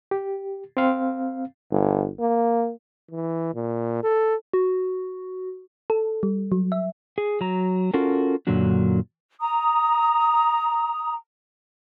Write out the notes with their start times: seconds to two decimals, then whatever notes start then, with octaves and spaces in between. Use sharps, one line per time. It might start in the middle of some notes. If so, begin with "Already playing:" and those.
0.11 G4
0.77 C4 F5
1.71 G1
2.20 A#3
3.11 E3
3.55 A#2
4.03 A4
4.53 F#4
5.90 A4
6.23 G3
6.52 F#3
6.72 E5
7.18 G#4
7.41 F#3 A#5
7.94 C#4 F4 F#4 A4 A#4
8.47 F#2 A#2 D3 F#3 D4
9.41 A#5 D#6